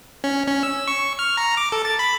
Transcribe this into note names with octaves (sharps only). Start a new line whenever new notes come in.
C#4
C#4
E6
C#6
F6
A#5
D6
A4
A6
B5